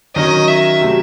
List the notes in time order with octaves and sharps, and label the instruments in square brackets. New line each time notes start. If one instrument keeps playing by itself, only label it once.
[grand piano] D#3 F#3 C#4 [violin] D#5
[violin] E5
[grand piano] C3 F#3 A3